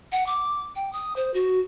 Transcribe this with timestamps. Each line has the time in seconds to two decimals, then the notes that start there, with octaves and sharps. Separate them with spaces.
0.12 F#5
0.26 D6
0.76 G5
0.93 D#6
1.16 C5
1.34 F#4